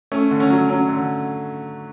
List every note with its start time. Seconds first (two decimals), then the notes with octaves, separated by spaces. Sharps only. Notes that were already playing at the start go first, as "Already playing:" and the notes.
0.12 A3 C#4
0.31 D3
0.40 C#4
0.50 F#3
0.69 F#3 C#4
0.88 D3